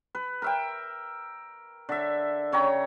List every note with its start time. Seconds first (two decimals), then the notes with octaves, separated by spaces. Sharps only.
0.15 B4
0.42 A#4 E5 G5
1.89 D3 E5
2.52 C#3 C#5 G5 A#5